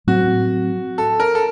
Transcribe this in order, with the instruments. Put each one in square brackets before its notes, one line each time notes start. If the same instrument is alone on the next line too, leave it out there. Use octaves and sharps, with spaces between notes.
[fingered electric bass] A2 F#3 C4 [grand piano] F#4
[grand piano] A4
A#4
A4